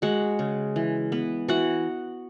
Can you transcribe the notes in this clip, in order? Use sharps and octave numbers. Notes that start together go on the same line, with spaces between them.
G#3 F#4 F#5
C#3
E3
B3
E3 F#4 F#5